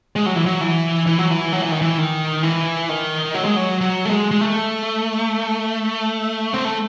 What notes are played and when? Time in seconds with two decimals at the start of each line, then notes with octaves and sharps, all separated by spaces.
0.16 G#3
0.26 F#3
0.36 E3
0.46 F#3
0.61 E3
1.06 E3
1.18 F#3
1.31 E3
1.53 F#3
1.62 E3
1.72 D#3
1.82 E3
1.98 D#3
2.43 E3
2.89 D#3
3.34 F#3
3.45 G#3
3.56 F#3
3.81 F#3
4.05 A3
4.11 G#3
4.31 G#3
4.41 A3
6.54 C4
6.65 A3